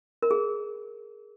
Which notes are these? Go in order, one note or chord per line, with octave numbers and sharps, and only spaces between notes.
A#4
G#4